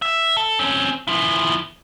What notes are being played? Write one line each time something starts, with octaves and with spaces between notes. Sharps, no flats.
E5
A4
C4 C#4
F3 E4